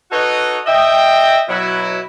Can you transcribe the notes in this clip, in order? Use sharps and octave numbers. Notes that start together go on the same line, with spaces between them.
D#4 F#4 A4 B4 C#5 D#5
D#5 E5 G5
B2 F#3 E4